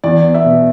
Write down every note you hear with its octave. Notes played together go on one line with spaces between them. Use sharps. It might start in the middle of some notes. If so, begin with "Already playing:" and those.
E2 D5
B3
E5
B2